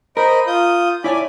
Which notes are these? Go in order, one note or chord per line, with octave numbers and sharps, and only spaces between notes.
A#4 C5 D#5 B5
F4 D#6 G6
E4 C#5 D5 G#5 D6